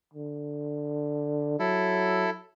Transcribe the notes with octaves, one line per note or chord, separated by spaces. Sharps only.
D3
F#3 E4 A4